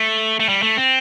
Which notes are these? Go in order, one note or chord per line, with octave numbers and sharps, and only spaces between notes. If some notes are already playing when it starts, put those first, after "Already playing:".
Already playing: A3
A3
G3
A3
C4